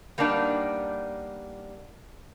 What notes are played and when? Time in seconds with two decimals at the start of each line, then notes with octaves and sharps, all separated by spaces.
0.18 G3 A#3 B3 D4 D#4